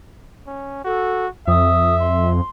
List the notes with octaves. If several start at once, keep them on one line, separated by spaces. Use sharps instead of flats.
C#4
F#4 A4
F2 E5 D#6
C6